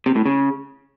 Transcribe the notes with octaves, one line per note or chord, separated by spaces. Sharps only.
C3
A2
C#3